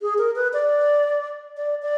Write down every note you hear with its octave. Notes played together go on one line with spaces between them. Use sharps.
G#4
A#4
B4
D5
D5
D5